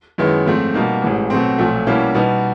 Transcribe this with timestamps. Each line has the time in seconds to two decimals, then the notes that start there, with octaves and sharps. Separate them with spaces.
0.18 F#2 D#3 G#3 B3 E4
0.47 G#2 F3 A3 C4
0.74 B2 G3 A#3 D#4
1.02 A1 G#2 E3
1.30 B2 F#3 A3 C4
1.58 B1 A#2 F3 A3
1.87 B2 G3 A#3 C#4 E4
2.14 B2 G3 B3 D#4